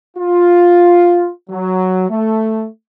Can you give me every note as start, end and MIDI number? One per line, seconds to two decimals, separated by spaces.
0.17 1.28 65
1.50 2.07 54
2.09 2.66 57